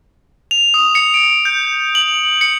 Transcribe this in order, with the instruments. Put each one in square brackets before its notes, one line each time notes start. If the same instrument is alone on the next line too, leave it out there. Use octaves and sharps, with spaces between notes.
[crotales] F7
D#6
C#7
D7
G6
F#7
C#7